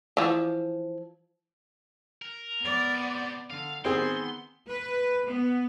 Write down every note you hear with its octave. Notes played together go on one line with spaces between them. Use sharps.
E3 F3
A#4
B3 D5
C3
D3 F5
D#3 B3 C4 G#4 C6
B4
B3